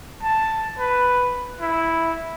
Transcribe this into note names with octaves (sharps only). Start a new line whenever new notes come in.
A5
B4
E4